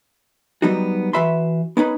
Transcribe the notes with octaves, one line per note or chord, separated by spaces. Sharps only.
F#3 G3 B3 D#4 F#4
E3 F#4 B4 E5 B5 C6
B3 C#4 D#4 B4